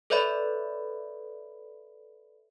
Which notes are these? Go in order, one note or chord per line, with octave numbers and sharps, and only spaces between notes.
A4 B4 C#5 D5 E5 B5